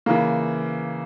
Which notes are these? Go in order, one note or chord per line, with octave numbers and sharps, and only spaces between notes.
C#3 E3 A#3